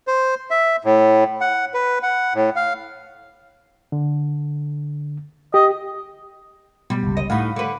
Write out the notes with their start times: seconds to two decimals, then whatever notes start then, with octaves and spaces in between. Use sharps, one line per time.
0.07 C5
0.51 E5
0.84 A2
1.41 F#5
1.74 B4
2.03 F#5
2.34 A2
2.56 F5
3.92 D3
5.54 G4 D#5
6.90 B2 G3
7.03 G1 C#2
7.17 D#5
7.30 A2 D#4 F5 F#5 B5
7.56 D3 B4